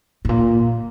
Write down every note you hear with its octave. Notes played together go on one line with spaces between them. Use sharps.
A2
A#2